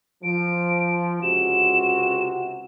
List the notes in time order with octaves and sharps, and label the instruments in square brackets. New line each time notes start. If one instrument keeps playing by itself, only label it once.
[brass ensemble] F3 [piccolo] D7
[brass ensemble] C#2 C3 F#4 [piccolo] E7